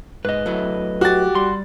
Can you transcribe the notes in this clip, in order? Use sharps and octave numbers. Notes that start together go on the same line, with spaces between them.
G#2 D#4 B4 D#5
F#3 A3 E4
F#4 G4 A6
G3 C6